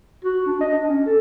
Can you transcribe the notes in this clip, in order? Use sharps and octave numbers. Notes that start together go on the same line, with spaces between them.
F#4
D4
D#5
D4
C#4
A4